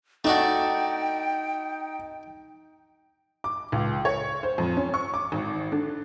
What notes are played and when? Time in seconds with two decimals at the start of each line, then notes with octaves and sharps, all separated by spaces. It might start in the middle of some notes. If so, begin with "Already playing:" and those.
0.25 A3 D4 D#4 F#4 G5
3.44 D6
3.72 C#2
4.05 C#5
4.43 C5
4.58 F2
4.77 C#4
4.94 C#6
5.14 D6
5.32 G#1
5.72 D3